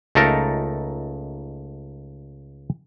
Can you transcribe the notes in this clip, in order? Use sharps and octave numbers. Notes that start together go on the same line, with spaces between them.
C#2 A3 D#4 A4 A#4